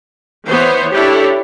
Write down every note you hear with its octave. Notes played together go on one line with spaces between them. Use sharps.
E3 B3 C5 C#5
D4 E4 G4 A4 C#5